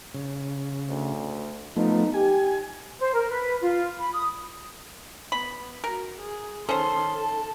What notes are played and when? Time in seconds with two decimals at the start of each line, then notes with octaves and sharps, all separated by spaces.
0.14 C#3
0.90 D2
1.76 F3 A3 B3 D#4
2.14 G4 G#5
3.00 C5
3.14 A#4
3.31 B4
3.61 F4
3.99 B5
4.13 D#6
5.32 B3 B5
5.84 F#4 A#4
6.20 G#4
6.69 D#3 C#4 A4 C5 C6
7.17 A5